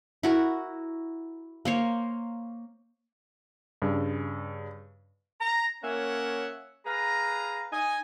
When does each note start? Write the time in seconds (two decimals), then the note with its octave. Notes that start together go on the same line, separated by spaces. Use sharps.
0.23 E4 F#4 A#4
1.65 A#3 C5 C#5
3.82 G2 C#3
5.40 A#5
5.82 A#3 C#4 C#5 E5 F#5
6.85 G#4 B4 F5 A#5
7.72 D#4 D#5 G#5